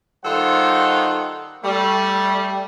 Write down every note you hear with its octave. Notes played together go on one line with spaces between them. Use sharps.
D#3 G3 F4 A4 C5 F#5
G3 A3